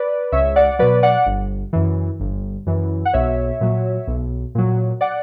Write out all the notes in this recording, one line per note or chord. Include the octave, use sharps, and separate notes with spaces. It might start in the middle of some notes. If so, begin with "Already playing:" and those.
Already playing: B4 D5
C#2 C#5 E5
D5 F#5
B2 F#3 B4 D5
D5 F#5
G1
F#2 E3
G1
F#2 E3
F#5
B1 C#5 E5
A#2 F#3
B1
A#2 F#3
D5 F#5